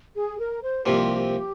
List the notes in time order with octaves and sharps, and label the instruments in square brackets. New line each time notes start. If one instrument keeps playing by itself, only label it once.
[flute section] G#4
A#4
C5
[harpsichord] C2 C3 F3 A#3 [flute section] G4